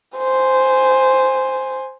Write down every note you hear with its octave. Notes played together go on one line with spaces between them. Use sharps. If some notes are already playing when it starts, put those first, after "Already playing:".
C5 G#5